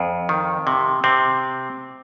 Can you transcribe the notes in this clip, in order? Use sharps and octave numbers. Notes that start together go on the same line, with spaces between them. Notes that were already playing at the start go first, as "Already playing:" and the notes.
Already playing: F2
D#3
C3
C3 C4